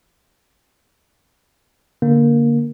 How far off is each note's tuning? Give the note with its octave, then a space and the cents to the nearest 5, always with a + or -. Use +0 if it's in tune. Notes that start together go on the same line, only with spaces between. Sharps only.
D3 -20 A#3 +5